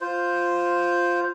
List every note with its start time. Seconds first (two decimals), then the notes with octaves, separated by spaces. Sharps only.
0.01 F4 C5